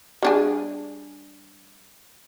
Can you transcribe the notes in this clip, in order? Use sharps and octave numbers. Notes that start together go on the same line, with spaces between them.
G3 D4 G#4